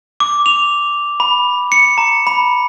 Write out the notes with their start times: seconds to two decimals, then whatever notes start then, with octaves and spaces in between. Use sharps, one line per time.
0.20 D6
0.46 F7
1.20 B5
1.72 C#7
1.98 A#5
2.27 B5